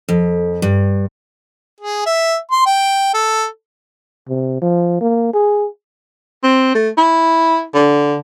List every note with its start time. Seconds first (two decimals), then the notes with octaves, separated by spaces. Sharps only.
0.09 F2
0.62 G2
1.80 G#4
2.06 E5
2.51 C6
2.66 G5
3.14 A4
4.29 C3
4.62 F3
5.01 A#3
5.34 G#4
6.43 C4
6.75 A3
6.98 E4
7.74 D3